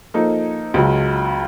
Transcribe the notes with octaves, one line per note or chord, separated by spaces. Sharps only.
F3 A#3 D#4 A4
C#2 C#3 F#3